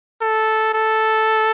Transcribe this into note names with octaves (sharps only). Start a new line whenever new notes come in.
A4
A4